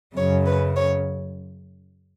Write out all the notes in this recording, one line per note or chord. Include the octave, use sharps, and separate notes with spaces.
F#2 C#3 F#3 C#5
B4
C#5